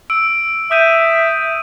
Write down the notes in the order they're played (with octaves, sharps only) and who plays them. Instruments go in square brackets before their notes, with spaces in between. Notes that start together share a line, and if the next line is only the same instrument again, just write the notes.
[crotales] E6 D7
[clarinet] E5 [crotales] D#6 G6 D#7